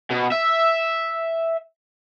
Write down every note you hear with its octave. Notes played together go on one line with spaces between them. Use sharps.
B2
E5